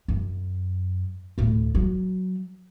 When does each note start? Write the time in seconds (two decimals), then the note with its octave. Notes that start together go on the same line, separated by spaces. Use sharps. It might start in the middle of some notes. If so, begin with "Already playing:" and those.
0.08 F#2
1.38 D2 A2
1.75 F#3